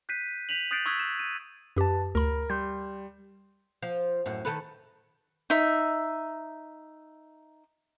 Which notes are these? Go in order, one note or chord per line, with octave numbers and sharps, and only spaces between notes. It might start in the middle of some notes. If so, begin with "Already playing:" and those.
F#6 G6 B6 C7 D#7
G6 B6 D#7 F7 F#7
D#6 F#6 G6 A6 C7 D7
C#6 D#6 E6 F#6 G#6 B6
E7
D#7
F#2 G4 B4 A5
D2 A#4 B5
G3 C6 G6
F3
F#2 A2
D#3 A4 B4
D#4 E5